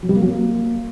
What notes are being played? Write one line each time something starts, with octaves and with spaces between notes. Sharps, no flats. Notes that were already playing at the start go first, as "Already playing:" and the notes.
F#3
G3
A#3
F#3
A#3